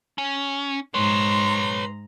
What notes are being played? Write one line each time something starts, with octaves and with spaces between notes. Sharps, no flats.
C#4
G#2 B4 C#5 A#5 C6